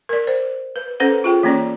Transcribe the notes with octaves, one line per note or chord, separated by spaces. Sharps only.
A#4 D5
C5
B4
C#4 A4 B4 C5 F#5
F4 G#4 G5
E3 A#3 C#4 C#5 D5